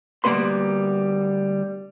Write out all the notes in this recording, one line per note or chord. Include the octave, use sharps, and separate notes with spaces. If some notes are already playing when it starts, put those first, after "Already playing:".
D2 G3 A#3 B3 B4 C6